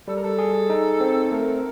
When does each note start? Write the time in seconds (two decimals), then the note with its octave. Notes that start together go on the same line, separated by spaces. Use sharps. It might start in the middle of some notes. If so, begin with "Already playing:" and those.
0.08 G3 A4
0.16 A#4
0.24 A4
0.38 G#4
0.70 D#4
1.00 C4
1.31 A3 A#4